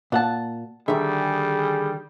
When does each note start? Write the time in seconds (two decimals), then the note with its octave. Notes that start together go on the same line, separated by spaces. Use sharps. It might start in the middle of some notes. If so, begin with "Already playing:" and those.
0.12 A#2 D4 F#5 A5
0.88 D3 D#3 G3 G#4 E5